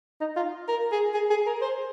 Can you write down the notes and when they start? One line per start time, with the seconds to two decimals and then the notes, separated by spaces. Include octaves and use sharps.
0.21 D#4
0.36 F4
0.68 A#4
0.92 G#4
1.14 G#4
1.30 G#4
1.46 A#4
1.61 C5